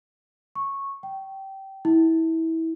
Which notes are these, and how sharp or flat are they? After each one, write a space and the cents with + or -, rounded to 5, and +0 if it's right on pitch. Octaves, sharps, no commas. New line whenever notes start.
C#6 -10
G5 -20
E4 -25